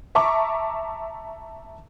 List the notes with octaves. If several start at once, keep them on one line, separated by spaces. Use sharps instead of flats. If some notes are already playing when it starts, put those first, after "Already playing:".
E5 A5 A#5 C#6 D6